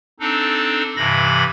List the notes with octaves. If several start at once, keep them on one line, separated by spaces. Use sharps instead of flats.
C4 D4 D#4 A4
G2 C3 E3 B5 A#6